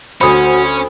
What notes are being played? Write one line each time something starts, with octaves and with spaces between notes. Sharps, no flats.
D2 C#4 F#4 C5 B5 D#6